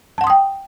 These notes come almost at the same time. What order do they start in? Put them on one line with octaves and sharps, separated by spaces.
A5 F#5 C6 D#6 G5